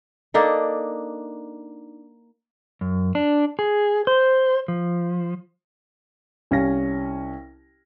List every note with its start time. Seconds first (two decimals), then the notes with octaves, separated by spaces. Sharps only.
0.34 A#3 D4 D#4 A4
2.81 F#2
3.15 D4
3.59 G#4
4.07 C5
4.68 F3
6.51 C2 C#4 F5 G#5 A#6